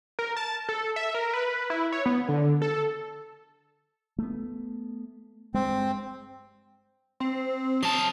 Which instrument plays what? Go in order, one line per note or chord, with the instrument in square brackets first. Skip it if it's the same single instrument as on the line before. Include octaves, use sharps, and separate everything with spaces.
[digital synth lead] A#4
A5
A4
E5
A#4
B4
E4
C#5
B3
D3
A4
[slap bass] A3 B3
[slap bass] G2 G#3 [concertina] C4
[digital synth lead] C4
[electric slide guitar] F#3 A5 [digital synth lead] D#6